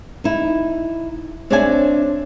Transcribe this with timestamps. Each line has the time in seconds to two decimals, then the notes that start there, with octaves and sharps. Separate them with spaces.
0.24 D#4 E4
1.50 C4 D4 C#5 D5 E5 G#5